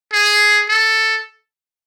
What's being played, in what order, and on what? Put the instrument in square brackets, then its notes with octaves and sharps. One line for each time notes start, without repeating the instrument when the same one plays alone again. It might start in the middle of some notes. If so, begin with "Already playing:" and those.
[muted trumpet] G#4
A4